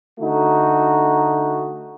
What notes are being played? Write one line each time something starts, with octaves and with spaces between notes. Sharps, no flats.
D3 A3 D#4 F#4